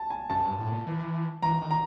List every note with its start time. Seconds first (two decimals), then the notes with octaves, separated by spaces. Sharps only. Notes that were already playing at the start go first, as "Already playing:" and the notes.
Already playing: A5
0.10 G#5
0.30 F#2 A5
0.44 G2
0.58 A2
0.72 A#2
0.87 E3
1.42 E3 A#5
1.62 D#3
1.71 A#5